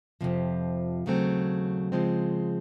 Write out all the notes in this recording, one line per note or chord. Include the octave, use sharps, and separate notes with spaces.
F2 C3 F3
D#2 C#3 F#3 A3 C4
C#3 F3 G#3 C4